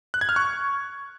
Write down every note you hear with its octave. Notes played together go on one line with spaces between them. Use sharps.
F#6
G#6
F6
C#6